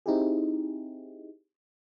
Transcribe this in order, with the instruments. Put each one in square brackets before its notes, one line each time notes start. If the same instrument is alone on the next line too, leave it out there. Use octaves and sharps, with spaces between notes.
[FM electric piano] C4 D#4 E4 G4 G#4